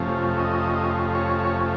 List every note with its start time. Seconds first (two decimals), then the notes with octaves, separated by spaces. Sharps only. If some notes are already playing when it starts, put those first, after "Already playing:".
Already playing: F2 C3 F3 A3 C#4
0.39 D#5
1.15 C#5
1.40 C#5